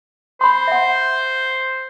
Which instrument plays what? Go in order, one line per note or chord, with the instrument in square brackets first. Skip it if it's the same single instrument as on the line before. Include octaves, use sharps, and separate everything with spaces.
[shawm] C5 [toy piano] B5 C6
[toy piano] E5 F#5